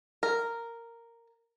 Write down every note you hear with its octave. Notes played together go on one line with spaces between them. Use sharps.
A#4